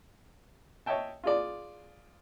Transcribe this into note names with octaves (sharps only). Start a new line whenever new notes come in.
C#5 D#5 E5 G5 A5
F4 G#4 D5